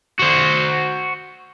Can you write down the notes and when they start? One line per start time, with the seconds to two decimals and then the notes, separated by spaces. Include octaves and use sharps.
0.19 F#4 C5